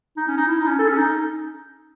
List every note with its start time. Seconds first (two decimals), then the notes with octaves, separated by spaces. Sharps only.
0.17 D#4
0.28 C#4
0.37 D#4
0.48 E4
0.58 D#4
0.68 C#4
0.79 A4
0.89 C#4
0.98 D#4